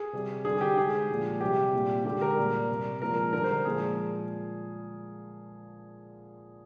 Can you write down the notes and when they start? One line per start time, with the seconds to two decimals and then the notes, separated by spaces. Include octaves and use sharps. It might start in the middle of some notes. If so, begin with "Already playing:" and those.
Already playing: G#4
0.13 C3 G3
0.45 D3 G3 G#4
0.61 G4
0.77 D3 G#3 G#4
1.09 A#2 F3 G#3
1.41 C3 G3 G4
1.74 A#2 G3
2.05 D3 G#3 G4
2.21 A#4
2.37 A#2 G3
2.69 C3 G3
3.02 A#2 F3 G#3 A#4
3.33 D3 G3 A#4
3.44 C5
3.65 A#2 F3 G#3 G#4